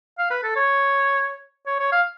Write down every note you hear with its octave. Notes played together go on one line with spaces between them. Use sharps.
F5
B4
A4
C#5
C#5
C#5
F5